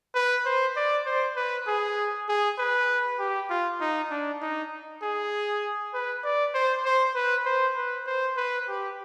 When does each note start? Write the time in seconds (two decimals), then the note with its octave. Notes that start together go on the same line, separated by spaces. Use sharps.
0.15 B4
0.45 C5
0.76 D5
1.05 C5
1.36 B4
1.67 G#4
2.28 G#4
2.58 B4
3.19 G4
3.50 F4
3.81 D#4
4.10 D4
4.42 D#4
5.02 G#4
5.94 B4
6.24 D5
6.54 C5
6.85 C5
7.15 B4
7.45 C5
7.76 B4
8.06 C5
8.37 B4
8.68 G4